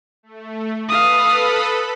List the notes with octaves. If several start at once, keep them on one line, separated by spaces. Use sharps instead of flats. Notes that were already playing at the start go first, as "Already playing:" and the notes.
A3
A4 B4 F5 B5 D#6